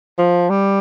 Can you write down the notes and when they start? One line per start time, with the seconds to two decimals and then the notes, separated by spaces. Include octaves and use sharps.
0.18 F3
0.50 G3